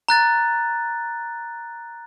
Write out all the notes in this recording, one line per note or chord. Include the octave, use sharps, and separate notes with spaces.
A#5 F#6 A6